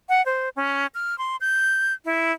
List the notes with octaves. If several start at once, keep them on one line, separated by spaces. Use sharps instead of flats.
F#5
C5
C#4
F6
C6
G6
E4